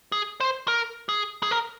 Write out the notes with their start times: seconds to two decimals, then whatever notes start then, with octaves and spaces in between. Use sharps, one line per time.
0.12 G#4
0.40 C5
0.68 A#4
1.09 G#4
1.43 G#4
1.51 A#4